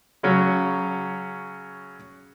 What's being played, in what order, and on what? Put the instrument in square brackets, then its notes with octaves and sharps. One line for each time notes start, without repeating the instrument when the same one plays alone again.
[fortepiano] C#3 F#3 C#4